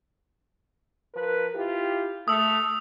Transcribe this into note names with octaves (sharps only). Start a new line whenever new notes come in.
F3 A#4 B4
E4 F4 G4
A3 D#6 E6